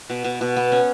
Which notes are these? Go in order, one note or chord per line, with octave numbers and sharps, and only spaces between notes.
B2
B2
B2
B3
C#4